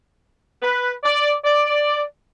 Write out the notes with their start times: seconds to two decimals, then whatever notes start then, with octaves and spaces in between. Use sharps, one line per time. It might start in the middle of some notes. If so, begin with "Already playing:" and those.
0.63 B4
1.04 D5
1.45 D5